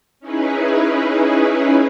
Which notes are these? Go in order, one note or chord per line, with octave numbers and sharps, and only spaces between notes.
C#4 D#4 E4 G#4 B4